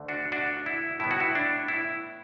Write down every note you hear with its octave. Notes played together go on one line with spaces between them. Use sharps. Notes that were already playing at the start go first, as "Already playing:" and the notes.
Already playing: D2 D3 A3
D4 F#4
D4 F#4
E4
A2 G3 B3 E4
F#4
E4
D4
E4